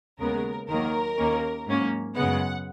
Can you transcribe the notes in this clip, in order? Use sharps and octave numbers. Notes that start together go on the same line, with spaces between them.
D#2 C#3 G#3 B3 A#4
D#2 D#3 F#3 A#3 A#4
D#2 D#3 A#3 C#4
G#2 F#3 A#3 C#4
F#2 C#3 G#3 B3 F#5